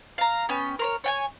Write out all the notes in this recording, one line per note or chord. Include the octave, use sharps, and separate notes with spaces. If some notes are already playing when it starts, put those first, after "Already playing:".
F5 A#5
B3 C#4 G5
A#4 C5 C#5
C#5 G5 G#5